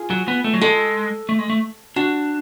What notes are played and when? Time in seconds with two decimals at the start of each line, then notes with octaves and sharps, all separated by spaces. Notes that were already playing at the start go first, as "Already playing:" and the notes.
Already playing: F4 G#4
0.10 F#3
0.28 B3
0.44 A3
0.54 F#3
0.61 G#3 A4
1.29 A3
1.39 G#3
1.50 A3
1.96 D4 F#4